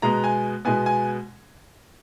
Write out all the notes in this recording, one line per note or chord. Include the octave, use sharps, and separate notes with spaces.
B2 G#3 B3 A#5
G#5
B2 G#3 B3 G#5
G#5